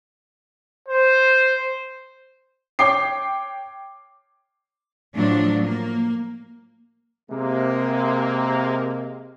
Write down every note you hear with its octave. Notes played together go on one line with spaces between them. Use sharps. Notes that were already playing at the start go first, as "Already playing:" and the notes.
C5
C#5 G5 D6 C7
A2 F3 F#3 D4
A#3
C3 G#3 A#3